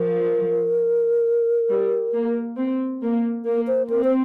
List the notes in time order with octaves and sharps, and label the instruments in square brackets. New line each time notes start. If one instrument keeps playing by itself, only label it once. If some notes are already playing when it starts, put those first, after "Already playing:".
Already playing: [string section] F3 [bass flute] A#4
[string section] G3
A#3
C4
A#3
[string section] A#3 [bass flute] A#4
[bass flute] C5
[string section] C4 [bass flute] A#4
[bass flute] C5